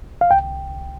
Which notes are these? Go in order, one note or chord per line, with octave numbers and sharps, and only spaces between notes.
F5
C2 G5